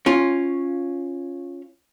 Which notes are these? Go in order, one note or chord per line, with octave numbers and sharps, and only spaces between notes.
C#4 F4